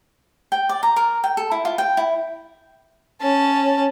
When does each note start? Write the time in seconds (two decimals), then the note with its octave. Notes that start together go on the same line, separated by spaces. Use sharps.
0.52 G5
0.69 D5
0.83 A#5
0.96 A#4
1.24 G5
1.37 A4
1.51 E4
1.65 F4
1.78 G5
1.97 E4
3.21 C#4 A5